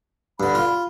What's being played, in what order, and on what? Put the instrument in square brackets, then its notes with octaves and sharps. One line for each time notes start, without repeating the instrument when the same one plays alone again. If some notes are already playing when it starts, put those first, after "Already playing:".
[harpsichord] G2 D3 [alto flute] B5
[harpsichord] F4